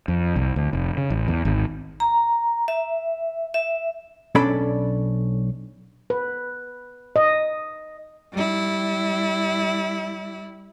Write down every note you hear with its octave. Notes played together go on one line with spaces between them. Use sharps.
F2
C2
D2
F1
C#3
A1
E2
G#1
A#5
E5
E5
B1 C#4 D4 A4 D5 B5
B4
D#5
G3 E4